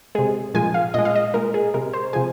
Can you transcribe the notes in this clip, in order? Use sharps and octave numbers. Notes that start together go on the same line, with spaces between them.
C3 G#3 G#4
A#2 F3 G#3 G#5
F5
A#2 G#3 D#5
F5
D#5
A#2 G#3 A#4
G#4
C3 G#3 A#4
C5
C3 F3 G#3 G#5